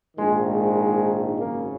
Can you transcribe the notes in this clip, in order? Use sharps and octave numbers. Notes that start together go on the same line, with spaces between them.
A#1 G#2 D#3 G#3
G#3
G#1 F#2 C#3 A#3